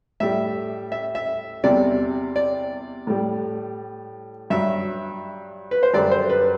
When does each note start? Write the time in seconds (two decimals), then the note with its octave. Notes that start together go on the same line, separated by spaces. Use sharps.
0.20 A2 G3 E5
0.92 E5
1.15 E5
1.64 E2 C3 G3 D5
2.36 D5
3.07 A2 G3
4.50 G2 F#3 E5
5.71 B4
5.83 C5
5.94 F#2 D3 G3 D5
6.12 C5
6.29 B4